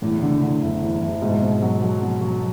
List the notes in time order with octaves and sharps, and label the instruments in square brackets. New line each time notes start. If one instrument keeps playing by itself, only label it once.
[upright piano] E2 [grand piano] A2
[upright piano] D3
D3
F#1
E2
F#1
[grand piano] G#2 [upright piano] B2
[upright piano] B2
F#3
F#3
B2
F#3